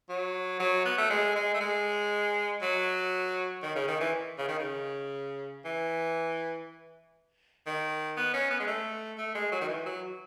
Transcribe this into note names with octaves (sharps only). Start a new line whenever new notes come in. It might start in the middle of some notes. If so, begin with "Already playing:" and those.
F#3
F#3
B3
A3
G#3
G#3
A3
G#3
F#3
D#3
C#3
D#3
E3
C#3
D#3
C#3
E3
D#3
B3
C#4
B3
G#3
A3
A3
G#3
F#3
D#3
E3
F#3